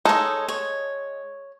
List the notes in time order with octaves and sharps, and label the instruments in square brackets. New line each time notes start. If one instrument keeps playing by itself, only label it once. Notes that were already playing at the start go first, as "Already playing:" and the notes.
[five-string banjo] G#3 D#4 [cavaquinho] A4 C#5
[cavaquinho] C#5